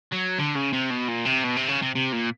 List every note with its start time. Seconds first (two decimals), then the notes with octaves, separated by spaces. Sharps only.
0.13 F#3
0.39 D3
0.56 C#3
0.73 C3
0.91 B2
1.08 A#2
1.25 C3
1.43 B2
1.56 C3
1.68 C#3
1.82 C3
1.95 C3
2.13 A#2